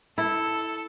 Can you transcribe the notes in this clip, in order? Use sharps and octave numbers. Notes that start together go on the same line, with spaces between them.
E4 A4